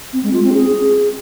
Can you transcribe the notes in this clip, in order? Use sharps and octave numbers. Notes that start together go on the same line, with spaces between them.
C4
G#3
F4
C4
G#4